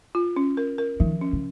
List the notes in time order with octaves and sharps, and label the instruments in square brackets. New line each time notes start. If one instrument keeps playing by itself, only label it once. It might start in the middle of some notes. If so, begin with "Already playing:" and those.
[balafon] F4
C#4
A#4
A#4
[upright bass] D#3 [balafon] F3
[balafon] C#4
[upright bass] C#3